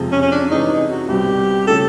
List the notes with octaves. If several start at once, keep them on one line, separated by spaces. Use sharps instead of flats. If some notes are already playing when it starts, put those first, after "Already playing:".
Already playing: F2 C3 F3 G#3 C4
C#4
C#4
D4
C3 E3 G#3 C#4 D#4
F#4
C2 B2 G3 C4 G4
C#3 F3 A3 C#4 A4